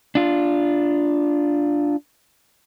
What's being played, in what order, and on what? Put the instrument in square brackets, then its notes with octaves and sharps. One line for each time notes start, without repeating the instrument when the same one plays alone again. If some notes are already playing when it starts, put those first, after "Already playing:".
[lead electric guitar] D4 F4